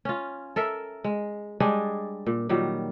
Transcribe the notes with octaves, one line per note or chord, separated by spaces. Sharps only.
C#4 F4
A4 A#4 E5
G#3
G3 G#3 D4 G#4
A#2
A#2 D#3 F#3 G3